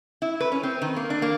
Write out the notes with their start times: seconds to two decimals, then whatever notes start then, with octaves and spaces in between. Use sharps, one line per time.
0.22 E4
0.40 B4
0.52 C#4
0.63 C4
0.82 D#3
0.96 A#3
1.10 D4
1.22 A#3